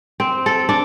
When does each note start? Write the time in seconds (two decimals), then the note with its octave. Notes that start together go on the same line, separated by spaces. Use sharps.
0.20 C4
0.46 A4
0.69 D4